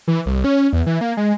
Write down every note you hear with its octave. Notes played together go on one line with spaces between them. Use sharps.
E3
C2
C#4
E2
E3
A#3
G#3